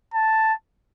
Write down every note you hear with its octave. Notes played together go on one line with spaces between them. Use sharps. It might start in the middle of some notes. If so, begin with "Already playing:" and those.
A5